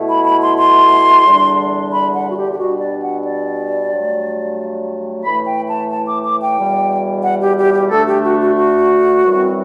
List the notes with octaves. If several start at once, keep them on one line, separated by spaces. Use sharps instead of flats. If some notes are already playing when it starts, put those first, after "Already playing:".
Already playing: B2 A3 E4
B5
B5
C6
C6
E2 D3 G3 D4
B5
F#5
F#4
G4
G4
B2 G3 D4 F#4
D5
F#5
D5
G2 F#3 A3
A2 E3 A3 B5
G5
A5
A5
D6
D6
G5
E2 B2 G3
F#5
G4
G4
G4
D2 D3 A3 D4 A4
G4
F#4
F#4
F#4
F#2 E3 G3 C4